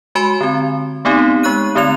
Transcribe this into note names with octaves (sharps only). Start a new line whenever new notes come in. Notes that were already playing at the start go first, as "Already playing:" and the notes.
G#3 F#4 G#5 B5 C6
D3 C4
A3 B3 C4 D#4 G4
G#3 C#6 F#6 D#7
D3 A3 C4 F7